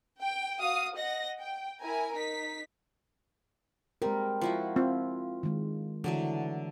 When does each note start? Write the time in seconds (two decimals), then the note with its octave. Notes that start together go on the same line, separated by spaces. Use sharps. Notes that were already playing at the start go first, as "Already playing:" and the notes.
0.20 G5
0.60 F#4 F5 D#6
0.95 D#5 F#5 A#6
1.40 G5
1.81 E4 A#4 G#5
2.15 D#4 B6
4.02 G3 G#3 C4 A#4
4.41 F3 E4 F#4
4.76 C4 F4
5.43 D#3 G#3
6.04 D3 E3 F#3 A3